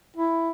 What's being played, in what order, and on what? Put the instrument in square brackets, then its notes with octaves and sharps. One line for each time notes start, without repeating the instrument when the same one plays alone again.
[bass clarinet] E4